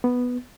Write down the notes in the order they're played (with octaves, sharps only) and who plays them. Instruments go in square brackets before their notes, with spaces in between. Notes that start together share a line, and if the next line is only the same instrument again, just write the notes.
[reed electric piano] B3